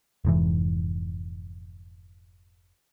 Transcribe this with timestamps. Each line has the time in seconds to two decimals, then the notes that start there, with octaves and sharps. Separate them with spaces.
0.25 F1 G#2 E3